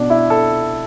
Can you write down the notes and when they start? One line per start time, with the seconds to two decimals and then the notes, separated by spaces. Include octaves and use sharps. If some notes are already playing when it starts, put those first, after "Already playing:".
Already playing: B2 D4
0.10 E4
0.30 A4